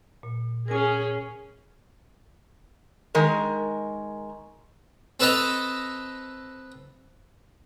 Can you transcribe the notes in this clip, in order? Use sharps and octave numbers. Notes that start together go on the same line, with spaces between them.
A#2
C#4 G#4 A#4 G#5
D#3 G#3 A#4
C4 A4 B4 D#5 A5 A#5